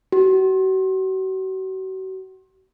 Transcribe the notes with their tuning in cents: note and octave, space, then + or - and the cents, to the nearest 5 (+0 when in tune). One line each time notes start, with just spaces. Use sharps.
F#4 +40